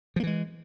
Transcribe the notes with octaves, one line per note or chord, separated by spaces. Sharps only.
E3 F3 G#3 A#3